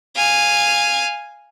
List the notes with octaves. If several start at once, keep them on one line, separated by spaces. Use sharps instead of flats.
F5 G#5